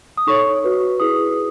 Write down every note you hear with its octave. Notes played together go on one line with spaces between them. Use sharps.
D#6
D#4 A4 C#5 C#6
F#4 B4
E4 G#4 B4 D#6